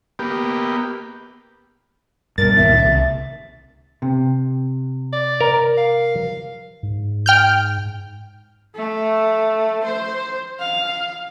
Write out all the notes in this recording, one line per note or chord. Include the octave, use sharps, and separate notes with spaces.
A#3 B3 G4
G2 B2 A#4 A6
C#2 A#2 D#3 E5
C2
C3
D5
A#4
F5
G#2
G5 F6 G6
A3
C5
F5